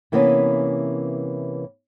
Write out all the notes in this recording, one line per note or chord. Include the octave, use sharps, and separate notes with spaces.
C3 E3 A#3 B3 C#4